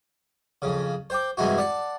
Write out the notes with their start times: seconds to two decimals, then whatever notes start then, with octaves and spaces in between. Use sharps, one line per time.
0.62 F2 C#3
1.10 C5 G5 D6
1.37 G2 C3 E3 G#3 E4 F#4
1.58 D5 F#5 A5